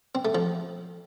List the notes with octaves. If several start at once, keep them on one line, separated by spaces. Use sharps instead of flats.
C4
A3
F3